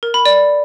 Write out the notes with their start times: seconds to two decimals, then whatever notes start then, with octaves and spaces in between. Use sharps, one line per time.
0.03 A#4
0.14 B5
0.25 D5